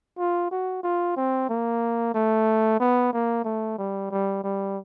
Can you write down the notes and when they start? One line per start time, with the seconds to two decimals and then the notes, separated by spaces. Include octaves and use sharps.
0.18 F4
0.51 F#4
0.83 F4
1.17 C4
1.49 A#3
2.15 A3
2.80 B3
3.13 A#3
3.45 A3
3.78 G3
4.11 G3
4.44 G3